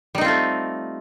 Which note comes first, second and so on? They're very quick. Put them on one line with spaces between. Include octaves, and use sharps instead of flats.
G3 D#4 C4 F4 A3